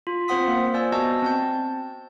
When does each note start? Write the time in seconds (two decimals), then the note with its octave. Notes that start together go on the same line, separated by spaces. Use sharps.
0.07 F4
0.28 C4 F4 C5 F#5 D#6 B6
0.48 A#3 C5
0.74 C5 D5 G#5 E6
0.92 B3 F#4 D#5 A5 E6 G6
1.22 C4 A5 G6